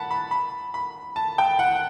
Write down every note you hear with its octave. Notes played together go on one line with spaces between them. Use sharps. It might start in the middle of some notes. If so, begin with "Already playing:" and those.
Already playing: F#5 A5 B5
B5
B5
B5
A5
G5
F#5